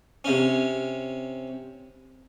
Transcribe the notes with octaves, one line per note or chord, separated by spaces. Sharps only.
C3 C#4